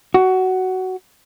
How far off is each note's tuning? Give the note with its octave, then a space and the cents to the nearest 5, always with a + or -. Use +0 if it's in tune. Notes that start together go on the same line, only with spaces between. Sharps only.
F#4 +15